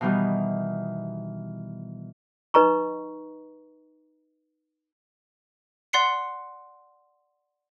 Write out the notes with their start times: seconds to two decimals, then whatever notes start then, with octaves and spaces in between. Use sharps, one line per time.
0.01 B2 D#3 E3 G3
2.54 D#4 B4 D#5 A#5 C#6
5.93 D5 F#5 C6 F#6 C7 C#7